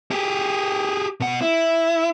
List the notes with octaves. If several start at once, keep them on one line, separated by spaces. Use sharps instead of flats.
G4 G#4
B2 F#5
E4